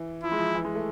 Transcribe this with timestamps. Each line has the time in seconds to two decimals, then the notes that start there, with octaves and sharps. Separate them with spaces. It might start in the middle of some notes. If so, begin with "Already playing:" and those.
Already playing: E3
0.23 F3 E4
0.32 G#3
0.39 F3
0.55 E3
0.64 G#3
0.75 A3